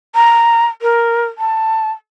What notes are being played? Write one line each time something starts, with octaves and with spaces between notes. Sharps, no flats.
A#5
A#4
A5